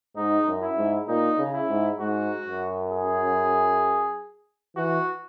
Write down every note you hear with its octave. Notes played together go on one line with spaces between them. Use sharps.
G#2 D#4
F#2
E4
G#2
A#2 D#4
C#3
E4
G#2
G#2 F#4
F#2
G#4
E3 F#4